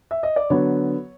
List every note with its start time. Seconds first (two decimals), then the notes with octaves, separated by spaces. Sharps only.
0.11 E5
0.23 D#5
0.36 D5
0.50 D3 F#3 B3 C#5